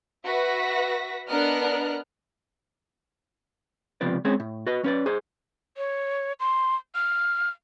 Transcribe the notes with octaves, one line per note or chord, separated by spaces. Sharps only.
F#4 B4 E5 A#6 B6
B3 D4 A#4 D#5 F6 F#6
C#2 C3 F3 B3 D5
G#3 C4 C#4 G#4
A2
F#4 B4 D#5
C#4 B4 D5
G#4 C5
C#5
C6
F6